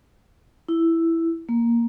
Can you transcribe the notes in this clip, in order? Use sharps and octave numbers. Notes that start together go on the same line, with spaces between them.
E4
A#3